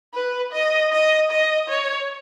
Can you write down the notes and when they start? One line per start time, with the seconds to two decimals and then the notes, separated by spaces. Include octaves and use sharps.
0.14 B4
0.53 D#5
0.92 D#5
1.31 D#5
1.69 C#5